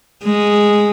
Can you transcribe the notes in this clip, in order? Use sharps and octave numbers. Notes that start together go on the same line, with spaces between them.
G#3